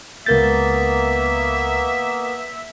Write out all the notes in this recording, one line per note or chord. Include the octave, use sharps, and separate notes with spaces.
C#2 A#3 B3 A#4 E5 G6 A6